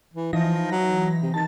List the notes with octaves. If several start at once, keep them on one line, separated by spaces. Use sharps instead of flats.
E3
E3 F3 D#4 A#6
F#3
C3
D#3 A5 A6